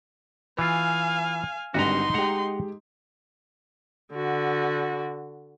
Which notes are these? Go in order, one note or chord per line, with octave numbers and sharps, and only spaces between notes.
E3 F4 F5 G#5
G#1 D3 G3 D#4 F#4 B4 A#5 C6
G#3 G4 F#5 A#5
D3 F#4